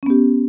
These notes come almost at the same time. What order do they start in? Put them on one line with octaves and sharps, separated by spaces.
C#4 B3 G4